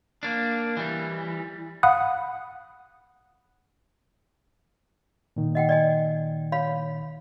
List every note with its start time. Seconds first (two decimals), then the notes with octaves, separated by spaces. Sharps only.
0.23 A#3 D4
0.77 E3 G3
1.83 F5 F#5 B5 D#6 F#6
5.36 A#2 D#3
5.55 D#5 F#5 G5
5.69 D5 D#5 G#5
6.52 C#5 F5 B5